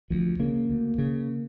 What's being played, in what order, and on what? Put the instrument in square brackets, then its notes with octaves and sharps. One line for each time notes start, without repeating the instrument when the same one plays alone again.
[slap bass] D2 F3
C#3 A#3
D2
C#3